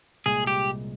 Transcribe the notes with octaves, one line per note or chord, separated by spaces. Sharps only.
C2 A#2 G#3 G#4
G4